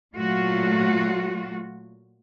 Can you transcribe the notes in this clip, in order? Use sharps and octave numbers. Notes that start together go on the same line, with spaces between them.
A#2 F#3 A3 F4 F#4